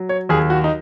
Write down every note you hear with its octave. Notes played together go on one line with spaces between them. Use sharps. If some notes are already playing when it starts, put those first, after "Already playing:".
Already playing: F#3
C#5
D#2 G#4
F#4
D#4